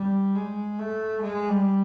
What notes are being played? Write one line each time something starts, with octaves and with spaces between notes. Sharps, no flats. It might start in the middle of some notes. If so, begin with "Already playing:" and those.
Already playing: G3
G#3
A3
G#3
G3